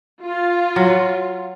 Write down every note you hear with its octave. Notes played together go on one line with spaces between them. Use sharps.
F4
F#3